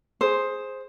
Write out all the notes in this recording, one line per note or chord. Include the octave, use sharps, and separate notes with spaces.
G#4 C5